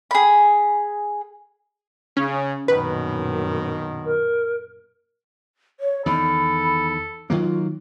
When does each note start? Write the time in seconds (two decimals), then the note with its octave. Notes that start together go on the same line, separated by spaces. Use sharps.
0.11 G#4 B5
2.17 C#3 C#4
2.68 A#1 F#2 B2 D#3 B4
4.04 A#4
5.80 C#5
6.06 E2 D#3 A4 B5
7.30 D#3 F#3 A#3 F4